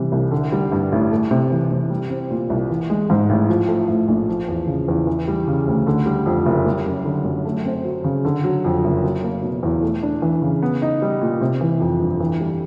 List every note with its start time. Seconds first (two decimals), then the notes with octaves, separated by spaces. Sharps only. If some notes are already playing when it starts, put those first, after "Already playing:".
Already playing: C3 E3 G3
0.12 C2
0.31 D3
0.52 G3
0.72 G2
0.92 A1
1.11 A3
1.31 C3
1.51 E3
1.71 C3
1.90 G3
2.10 C4
2.31 A#2
2.50 C2
2.69 E3
2.90 G#3
3.10 G#2
3.29 A1
3.49 F3
3.68 A3
3.88 A2
4.08 A#1
4.29 F3
4.48 E2
4.67 C#3
4.88 E2
5.07 E3
5.28 G3
5.47 C#3
5.67 D2
5.87 D3
6.06 G3
6.26 F2
6.46 F#1
6.65 G3
6.86 F#2
7.05 D3
7.25 F#2
7.45 A3
7.65 C4
7.84 F#3
8.04 C#3
8.25 D3
8.44 F#3
8.64 F2
8.84 F#1
9.03 F#3
9.24 A#3
9.43 B2
9.63 E2
9.83 A3
10.03 D4
10.22 E3
10.42 C#3
10.63 B3
10.82 D#4
11.02 G3
11.21 A#2
11.41 C3
11.61 E3
11.80 F2
12.00 G1
12.20 E3
12.41 G3